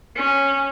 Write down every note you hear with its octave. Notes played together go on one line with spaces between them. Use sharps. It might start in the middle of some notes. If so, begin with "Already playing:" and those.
C#4